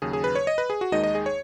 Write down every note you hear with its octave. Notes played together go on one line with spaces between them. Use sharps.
D#2 C#3 F#3 G#4
G#4
B4
C#5
D#5
B4
G#4
F#4
D#2 D#3 G#3 D#4 D#5
D#5
G#4
C#5